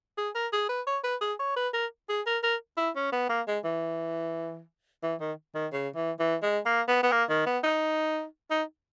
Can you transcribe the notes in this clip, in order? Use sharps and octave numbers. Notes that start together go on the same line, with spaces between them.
G#4
A#4
G#4
B4
C#5
B4
G#4
C#5
B4
A#4
G#4
A#4
A#4
E4
C#4
B3
A#3
G#3
E3
E3
D#3
D#3
C#3
E3
E3
G#3
A#3
B3
B3
A#3
D#3
B3
D#4
D#4